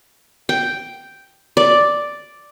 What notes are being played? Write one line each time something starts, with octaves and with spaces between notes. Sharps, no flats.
G5
D5